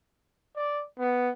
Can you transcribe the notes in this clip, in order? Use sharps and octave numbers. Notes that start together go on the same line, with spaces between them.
D5
B3